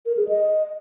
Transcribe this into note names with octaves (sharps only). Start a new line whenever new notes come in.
A#4
G#4
D#5